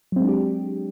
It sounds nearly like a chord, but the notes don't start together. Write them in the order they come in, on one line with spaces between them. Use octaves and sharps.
F#3 C4 G#3 D4 G4